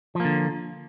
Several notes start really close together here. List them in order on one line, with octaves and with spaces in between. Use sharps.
F3 A#3 D3